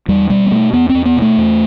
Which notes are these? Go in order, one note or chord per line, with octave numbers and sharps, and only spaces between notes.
E2 G3
B2 G3
B3
B2 A3
E2 B3
C4
E2
B3
B2
A3
E2